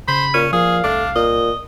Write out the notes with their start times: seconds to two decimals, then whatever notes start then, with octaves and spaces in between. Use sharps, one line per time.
0.08 C#3 C5 B5
0.34 A#2 C#4
0.53 A#2 F3 G#4 F5
0.84 C2 A3 D4
1.15 A#2 D#5